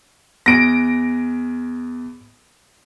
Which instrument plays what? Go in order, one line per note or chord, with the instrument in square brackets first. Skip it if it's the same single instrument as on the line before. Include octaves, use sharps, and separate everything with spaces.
[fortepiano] E2 [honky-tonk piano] A#6 D7